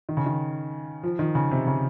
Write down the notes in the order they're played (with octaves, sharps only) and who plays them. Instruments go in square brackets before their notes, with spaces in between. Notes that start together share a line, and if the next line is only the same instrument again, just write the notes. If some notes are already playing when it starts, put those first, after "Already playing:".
[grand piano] D#3
C#3
D#3
F3
D#3
C#3
C3
C#3